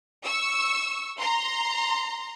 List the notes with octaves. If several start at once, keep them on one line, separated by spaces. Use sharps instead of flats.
C#6 E6
A#5 C6